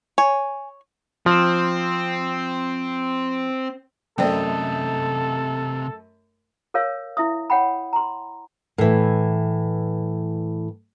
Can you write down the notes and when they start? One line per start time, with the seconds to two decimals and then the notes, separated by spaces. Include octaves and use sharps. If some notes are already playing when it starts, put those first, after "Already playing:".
0.18 C#5 G#5
1.26 F3 C4
4.18 F#2 C3 A3 A4 C5 D5 D#5 G5
6.74 A4 A#4 C#5 F5
7.17 E4 E5 D#6
7.50 C#5 F#5 G5 B5
7.93 A#5 C6
8.78 A2 E3